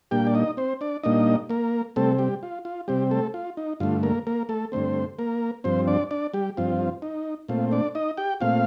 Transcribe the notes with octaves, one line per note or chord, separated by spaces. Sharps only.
A#2 G3 A#3 D4 G4 G5
D5
D#4 D#5
C4 C5
D4 D5
A#2 G3 A#3 D4 D#4 D#5
A#3 A#4
C3 G3 A3 C4 A4
G3 G4
F4
F4
C3 G3 C4 G4
A3 A4
F4
D#4
G2 D3 A3 F4
A#3 A#4
A#3 A#4
A3 A4
G2 D3 A3 C4 C5
A#3 A#4
G2 F3 C4 C5
D4 D5
D4 D5
G3 G4
G2 F3 C4 F4
D#4
A#2 A3 C4 F4
D4 D5
D#4 D#5
G4 G5
A#2 A3 C4 F4 F5